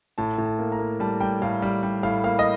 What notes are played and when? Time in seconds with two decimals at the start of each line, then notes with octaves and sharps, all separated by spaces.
0.18 A2 A5
0.38 A2
0.46 A5
0.59 A#3
0.72 A#5
0.79 A#3
1.00 G3 A5
1.20 G3 G5
1.42 A2 F5
1.62 G3 F5
1.83 G3
2.03 A2 F5
2.24 A#3 F5
2.39 D#5